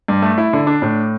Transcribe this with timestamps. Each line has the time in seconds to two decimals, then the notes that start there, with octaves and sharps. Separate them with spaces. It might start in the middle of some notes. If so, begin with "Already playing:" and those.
0.08 G2
0.22 A3
0.38 E4
0.53 D3
0.67 D4
0.82 A2